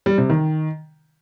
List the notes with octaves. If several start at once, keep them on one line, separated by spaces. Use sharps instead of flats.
G3
C3
D#3